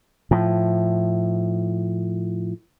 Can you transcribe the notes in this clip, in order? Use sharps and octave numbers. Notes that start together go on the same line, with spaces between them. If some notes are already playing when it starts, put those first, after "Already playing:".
A2 F3